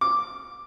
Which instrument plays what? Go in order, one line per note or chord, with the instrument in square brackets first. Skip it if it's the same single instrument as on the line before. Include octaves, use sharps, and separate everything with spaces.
[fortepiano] D6